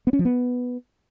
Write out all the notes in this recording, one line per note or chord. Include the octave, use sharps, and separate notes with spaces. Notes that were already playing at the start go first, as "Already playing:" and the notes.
B3
C#4
F3
B3